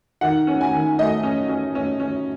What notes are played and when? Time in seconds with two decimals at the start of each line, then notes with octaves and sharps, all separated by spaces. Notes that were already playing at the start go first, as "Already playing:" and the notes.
0.21 D#3 F#5
0.47 C#4
0.61 G#5
0.73 D#3
0.98 A3 D#5
1.23 C#4
1.49 C#4
1.75 C#4
2.00 C#4